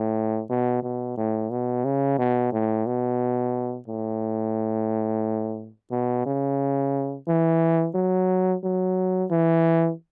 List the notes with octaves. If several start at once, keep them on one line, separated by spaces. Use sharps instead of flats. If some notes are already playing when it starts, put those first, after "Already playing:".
Already playing: A2
B2
B2
A2
B2
C#3
B2
A2
B2
A2
B2
C#3
E3
F#3
F#3
E3